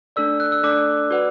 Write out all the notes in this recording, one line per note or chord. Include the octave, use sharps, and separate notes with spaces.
A3 D4 A4 D5 E6
F#6
E6
A3 D4 A4 D5 D6
F#4 B4 D5 F#5